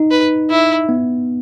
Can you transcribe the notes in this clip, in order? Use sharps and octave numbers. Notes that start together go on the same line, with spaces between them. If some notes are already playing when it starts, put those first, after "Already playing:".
Already playing: D#4
B4
E4
B3